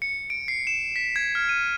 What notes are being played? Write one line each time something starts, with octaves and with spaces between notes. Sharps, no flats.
C#7
D7
C7
E7
B6
G#6
F6
D#7